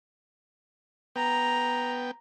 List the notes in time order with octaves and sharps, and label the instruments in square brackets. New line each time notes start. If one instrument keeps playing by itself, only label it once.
[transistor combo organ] B3 G5 [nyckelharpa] A#5